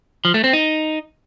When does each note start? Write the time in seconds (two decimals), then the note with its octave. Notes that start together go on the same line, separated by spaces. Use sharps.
0.25 F3
0.34 A3
0.44 C4
0.53 D#4